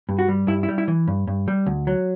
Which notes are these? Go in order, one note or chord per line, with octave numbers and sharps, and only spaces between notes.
G2
F#4
G3
G2 E4
E4
G3
E4
E3
G2
G2
G3
D2
F#3